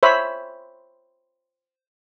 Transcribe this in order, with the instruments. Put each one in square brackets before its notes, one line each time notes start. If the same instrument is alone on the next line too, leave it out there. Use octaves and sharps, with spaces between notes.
[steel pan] C5 C#5 E5 B5